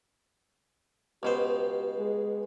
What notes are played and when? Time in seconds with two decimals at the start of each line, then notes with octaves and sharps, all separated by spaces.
1.23 C#2 B2 G4 C5
1.98 G#3